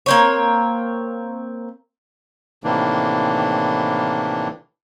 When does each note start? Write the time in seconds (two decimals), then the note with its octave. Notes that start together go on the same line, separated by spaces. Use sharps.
0.06 A#3 C4 C#5
2.64 A2 C3 D#3 E3 A#3 D4